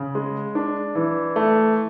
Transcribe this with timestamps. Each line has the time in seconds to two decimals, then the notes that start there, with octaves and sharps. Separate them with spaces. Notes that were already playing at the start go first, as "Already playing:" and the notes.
Already playing: C#3
0.15 G#3
0.55 D4
0.95 E3
1.36 A3